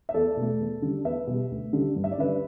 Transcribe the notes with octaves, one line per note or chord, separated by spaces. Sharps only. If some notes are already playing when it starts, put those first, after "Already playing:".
E5
E2 A4 D5
B2 A3
E2
D3 G3
E2 B4 E5
B2 G3
D2
D3 G3
G2
E5
D5
D3 G3 B4 E5